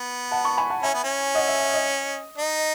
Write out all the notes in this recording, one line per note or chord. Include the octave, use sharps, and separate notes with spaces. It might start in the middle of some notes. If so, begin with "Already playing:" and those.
Already playing: B3
F#5 A5
A5 C#6
G#5 B5
F#5 A5
C#4 E5 G#5
B3
C#4
D#5 F#5
E5
E5
D#5
D#4